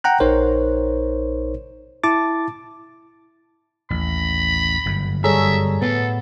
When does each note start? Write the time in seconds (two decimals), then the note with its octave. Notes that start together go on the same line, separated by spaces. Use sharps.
0.04 F#5 G5 A#5 F#6
0.20 A#1 D#4 A#4 C5 C#5
2.04 E4 A5 D6 A6
3.90 A1 D#2 B5
4.86 G1 F#2
5.24 G3 G#4 A4 C#5 E5 A#5
5.82 A2 B3 A4